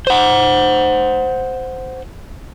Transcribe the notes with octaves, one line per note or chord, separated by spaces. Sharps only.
C5 F#5